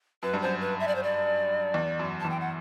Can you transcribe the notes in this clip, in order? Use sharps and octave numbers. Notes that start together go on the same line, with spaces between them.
F#2 B4
G2
F#2 C5
B4
E5
D5
C5
D5
E2
F#2
E2 A5
G5
F#5